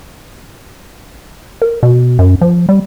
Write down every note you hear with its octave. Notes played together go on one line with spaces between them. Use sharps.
A#4
B2
F#2
F3
G3